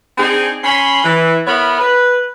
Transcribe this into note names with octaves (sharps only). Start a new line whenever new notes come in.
C4 D4 D#4 G#4
C#4 B5 C6
E3
B3 E4 A#4 C#5 B5
B4